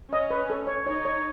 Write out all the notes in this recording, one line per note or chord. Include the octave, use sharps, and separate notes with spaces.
C#4 D#5
B4
A4
C#5
D#4 C#5
C#5